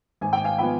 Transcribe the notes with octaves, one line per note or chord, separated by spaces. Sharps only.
G#1 G#5
G5
F5 G#5
F3 B3 G5 B5